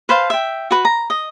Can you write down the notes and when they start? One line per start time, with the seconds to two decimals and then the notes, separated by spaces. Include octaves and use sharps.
0.09 B4 C5 F5 A5
0.30 E5 G5
0.71 F#4 B4
0.85 A#5
1.10 D#5